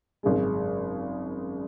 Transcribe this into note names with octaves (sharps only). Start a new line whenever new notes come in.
G#1 F#2 C#3 G#3